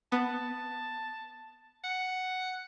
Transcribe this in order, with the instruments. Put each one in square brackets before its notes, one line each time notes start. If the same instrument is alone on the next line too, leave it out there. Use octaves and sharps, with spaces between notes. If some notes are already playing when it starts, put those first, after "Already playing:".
[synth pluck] B3 [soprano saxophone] A5
[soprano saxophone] F#5